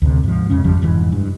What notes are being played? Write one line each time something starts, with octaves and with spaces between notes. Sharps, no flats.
D2 C3
G#2 F3
F2 G#2 C#3 C#4
G#1 F2 F3 G3
F1 G#2 E3
G2